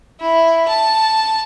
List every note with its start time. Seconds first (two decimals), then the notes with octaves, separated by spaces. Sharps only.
0.20 E4
0.68 A5